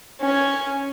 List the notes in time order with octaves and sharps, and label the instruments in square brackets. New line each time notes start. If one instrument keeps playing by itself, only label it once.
[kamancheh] C#4 G#5